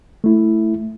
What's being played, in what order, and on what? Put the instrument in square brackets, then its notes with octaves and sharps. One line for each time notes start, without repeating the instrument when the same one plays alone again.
[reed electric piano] A3 E4